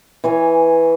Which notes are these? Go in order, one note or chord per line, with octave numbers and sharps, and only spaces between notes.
E3 C#5 G#5